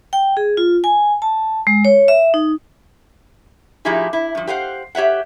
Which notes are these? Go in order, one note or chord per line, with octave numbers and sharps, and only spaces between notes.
G5
G#4
F4
G#5
A5
G#3
C#5
E5
D#4
A2 F3 D#4 E4 G4 G#4
E4
G2 F3
G4 C5 F5 F#5
G4 C#5 E5 F#5